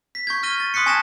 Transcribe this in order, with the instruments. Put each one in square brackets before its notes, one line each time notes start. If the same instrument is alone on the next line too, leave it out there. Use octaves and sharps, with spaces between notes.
[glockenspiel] B6
C#6 G6 G#6
F6 A#6 D#7 G7
A6
C6 D#6 F#6 B6 C#7
G#5 A5 C#6 G#6 A#6 E7